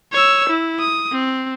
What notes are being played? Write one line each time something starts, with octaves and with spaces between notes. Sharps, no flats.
C#5 E6
E4
D#6
C4